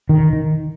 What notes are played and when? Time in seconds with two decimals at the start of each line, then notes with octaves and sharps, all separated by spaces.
0.09 D#3
0.33 D#3